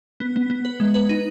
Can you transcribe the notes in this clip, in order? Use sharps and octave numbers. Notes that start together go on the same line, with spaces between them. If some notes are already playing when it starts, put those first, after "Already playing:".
B3
B3
B3
B4
G#3
B4
D#4